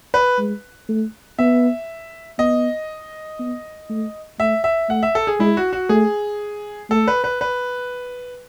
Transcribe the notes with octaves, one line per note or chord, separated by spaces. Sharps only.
B4
G#3
A3
B3 E5
B3 D#5
B3
A3
A3 E5
E5
A3 F#5
E5
A4
G#4
G#3 E4
F#4
F#4
A3 G#4
A3 A4
B4
B4
B4